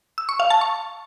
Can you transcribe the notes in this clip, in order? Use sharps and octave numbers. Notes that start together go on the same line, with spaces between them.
E6
C#6
F5
A5
C#6